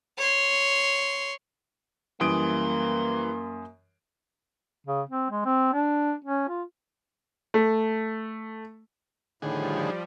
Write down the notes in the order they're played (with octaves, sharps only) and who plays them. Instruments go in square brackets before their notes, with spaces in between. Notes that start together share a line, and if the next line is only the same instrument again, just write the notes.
[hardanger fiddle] C#5 C6
[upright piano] F#2 D#6 D7 [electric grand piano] E3 G3 [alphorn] A#3 [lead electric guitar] C6
[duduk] C#3
C4
G#3
C4
D4
C#4
F4
[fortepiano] A3
[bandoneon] A2 [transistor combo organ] D3 D#3 G#4 [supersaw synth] F3 G3